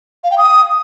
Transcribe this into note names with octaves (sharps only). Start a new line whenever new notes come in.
F5
G5
D#6